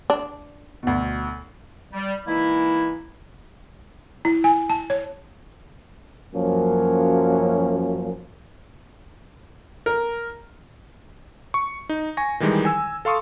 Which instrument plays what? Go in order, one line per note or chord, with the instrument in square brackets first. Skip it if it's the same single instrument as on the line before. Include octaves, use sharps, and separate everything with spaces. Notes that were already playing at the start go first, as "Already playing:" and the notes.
[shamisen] D4
[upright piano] D2 B2
[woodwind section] G3
E3 G#3 A#3 D#4 E4
[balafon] E4
G#5
A5
C#5
[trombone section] F#2 F3 F#3 A#3 C#4
[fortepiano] A#4
[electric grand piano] C#6
D#4
G#5 C#6 A#6
D#3 E3 G3 G#3 D#4
G#5 E6
A4 F5 C6 C#6 D#6